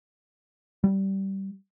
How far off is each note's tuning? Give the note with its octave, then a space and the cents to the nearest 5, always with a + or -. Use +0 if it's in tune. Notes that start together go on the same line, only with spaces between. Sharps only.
G3 -15